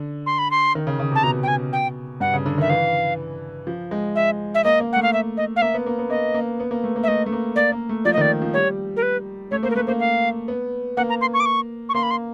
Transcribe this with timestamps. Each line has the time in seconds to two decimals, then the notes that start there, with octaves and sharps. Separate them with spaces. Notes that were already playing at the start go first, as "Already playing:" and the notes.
Already playing: D3
0.26 C6
0.39 B5
0.51 C6
0.75 D#3
0.87 C#3
0.99 C#3
1.11 C3
1.15 A5
1.23 B2 A#5
1.43 G5
1.48 G#5
1.73 G5
2.20 G2 F#5
2.33 C#3
2.46 D3
2.58 D#3 E5
2.70 E3 F5
3.67 F3
3.91 G#3
4.16 E5
4.55 E5
4.64 A#3 D#5
4.80 A#3
4.93 A3 F#5
5.03 F5
5.13 E5
5.37 D#5
5.56 F5
5.62 A#3 E5
5.74 B3
5.86 A#3
5.99 B3
6.10 A#3 D#5
6.34 A#3
6.60 B3
6.71 A#3
6.84 A3
6.96 A#3
7.03 E5
7.08 A3 D#5
7.26 A3
7.32 A#3
7.56 A#3 D5
7.72 A#3
7.89 A3
8.05 F3 D5
8.13 D#5
8.18 D#3
8.21 D5
8.42 F3
8.54 G3 C#5
8.96 A#4
9.02 B4
9.51 A3 C#5
9.63 A#3 C5
9.70 A#4
9.76 A3 B4
9.87 A#3 C5
10.00 F5
10.48 B3
10.97 A#3 F#5
11.10 A#5
11.21 C6
11.34 C#6
11.40 D6
11.46 C#6
11.89 C#6
11.94 A#3 C6
12.03 B5
12.11 C6